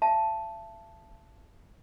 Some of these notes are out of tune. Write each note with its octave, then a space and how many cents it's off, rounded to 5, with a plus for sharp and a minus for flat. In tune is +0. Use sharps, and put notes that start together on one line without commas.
E5 +40 A5 -5